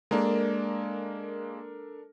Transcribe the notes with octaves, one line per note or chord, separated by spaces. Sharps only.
G#3 A#3 D4 A4 A#4